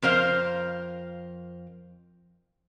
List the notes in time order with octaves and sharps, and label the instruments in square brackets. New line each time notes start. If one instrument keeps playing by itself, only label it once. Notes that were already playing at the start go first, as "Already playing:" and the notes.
[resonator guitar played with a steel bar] F2 A#4 C5 F5